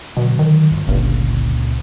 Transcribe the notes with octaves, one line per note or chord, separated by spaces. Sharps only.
B2 D3 F3 F#3
D#3
G1 D2 F3
G1 C#2 A#2 C#4